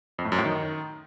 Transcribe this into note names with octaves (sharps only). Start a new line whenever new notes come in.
F2
A2
F#2
A2
D#3